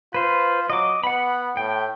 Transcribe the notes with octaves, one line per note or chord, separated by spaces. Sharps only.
F4 B4 C5
F#3 D#5 D6
B3 F#5 B5
A2 G5